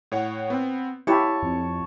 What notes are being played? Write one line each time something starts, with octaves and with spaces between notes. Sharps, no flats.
A2 C#5 F#5
B3 C4
E4 G4 C#5 A5 C#7
F2